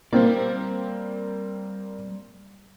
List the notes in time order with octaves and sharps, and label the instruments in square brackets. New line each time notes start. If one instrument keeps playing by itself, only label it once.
[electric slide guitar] G3 D5 [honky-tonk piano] A#3 C4